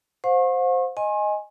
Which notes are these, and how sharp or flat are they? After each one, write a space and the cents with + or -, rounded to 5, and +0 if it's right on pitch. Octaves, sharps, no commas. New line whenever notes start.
C5 +0 F5 +45 C#6 -35
D#5 +0 G#5 +0 C6 +40